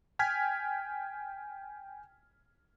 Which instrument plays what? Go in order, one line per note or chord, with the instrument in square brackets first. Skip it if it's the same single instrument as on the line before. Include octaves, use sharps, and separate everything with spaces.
[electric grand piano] G5 G#5 F6 G#6 B6